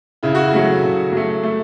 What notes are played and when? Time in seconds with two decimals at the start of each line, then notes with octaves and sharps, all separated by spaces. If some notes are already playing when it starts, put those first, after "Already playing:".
0.23 C#3 E4
0.35 F#4
0.46 E4
0.53 F#3 A3
0.83 C#3
1.12 F#3 A3
1.43 A3